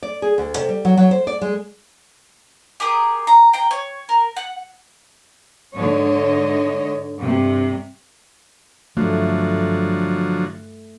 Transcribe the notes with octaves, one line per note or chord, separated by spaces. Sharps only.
D5
G#4
D2
C3
G3
F#3
F#3
C5
D5
G#3
G4 G#4 A#4 D#6
A#5
G5 A#5
C#5
A#4
F#5
G#2 D3 C#5 D#5
G2 C3
G2 D3 F3 F#3 A3